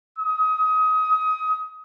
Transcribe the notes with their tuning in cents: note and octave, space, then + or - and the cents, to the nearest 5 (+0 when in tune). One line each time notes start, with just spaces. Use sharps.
D#6 +25